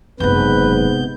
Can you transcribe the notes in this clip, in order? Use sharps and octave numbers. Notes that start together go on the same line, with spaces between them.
F#1 G#2 C3 F#3 B3 B4 G6